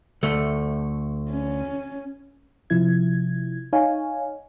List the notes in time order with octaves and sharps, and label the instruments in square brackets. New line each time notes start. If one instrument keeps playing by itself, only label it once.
[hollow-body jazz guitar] D2 A3
[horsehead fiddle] C#4
[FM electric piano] C3 F3 E4 G#6
D#4 C#5 F5 G#5